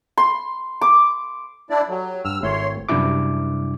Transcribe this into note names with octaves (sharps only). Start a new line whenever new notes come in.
C6
D6
D4 E4 D5
F#3 G4 A4
G2 E6 F6
G#1 A3 E4 C#5 C6
F#2 C3 G3 D4 E4 D6